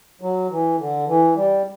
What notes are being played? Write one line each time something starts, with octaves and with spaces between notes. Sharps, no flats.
F#3
E3
D3
E3
G3